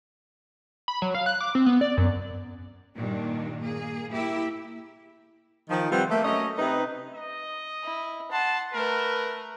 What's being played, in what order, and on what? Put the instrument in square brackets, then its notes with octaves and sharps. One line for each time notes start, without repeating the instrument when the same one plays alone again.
[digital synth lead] B5
F#3
F5
F#6
D6
C4
B3
D5
F#2
[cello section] G2 A#2 D#3 G3 D4
A#3 G#4
A#3 E4 G4 E5
[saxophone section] D#3 F3
C3 G3 C4 F4 B4 F#5
A3 A#3
F#3 A3 C#4 D#5
C3 D#4 B4
[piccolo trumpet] D#5
[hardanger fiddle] E4
[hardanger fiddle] F#5 C6 [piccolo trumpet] A5
[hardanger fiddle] A3 B4 [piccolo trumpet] A#4